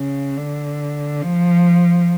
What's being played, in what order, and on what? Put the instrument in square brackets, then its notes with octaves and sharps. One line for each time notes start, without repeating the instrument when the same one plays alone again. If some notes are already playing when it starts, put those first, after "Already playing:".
Already playing: [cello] C#3
D3
F3